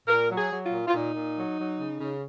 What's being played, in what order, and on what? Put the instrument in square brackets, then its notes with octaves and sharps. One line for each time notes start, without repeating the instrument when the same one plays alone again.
[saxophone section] A#2 A#4
F#3
G#4
F#3
F4
A#2
F4
A#2 D#4
A#2
F#3
F#3
C#3
C#3